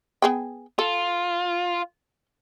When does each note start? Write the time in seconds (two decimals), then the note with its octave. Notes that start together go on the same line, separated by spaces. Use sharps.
0.22 B3 G#4 G5
0.79 F4 A4